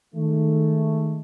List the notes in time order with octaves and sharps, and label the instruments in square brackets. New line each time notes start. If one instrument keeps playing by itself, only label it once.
[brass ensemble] D#3 G#3 A3